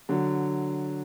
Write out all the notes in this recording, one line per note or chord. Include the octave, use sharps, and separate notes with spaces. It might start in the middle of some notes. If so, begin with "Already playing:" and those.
D3 F#3